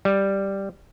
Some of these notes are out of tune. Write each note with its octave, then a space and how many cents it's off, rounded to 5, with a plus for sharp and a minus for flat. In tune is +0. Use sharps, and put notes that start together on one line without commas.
G3 +0